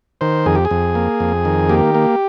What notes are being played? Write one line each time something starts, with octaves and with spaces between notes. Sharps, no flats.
D#3 C5
F2 G#4
G4
G#4
F2
A#3
F2
D#3
A#3 G4
A#3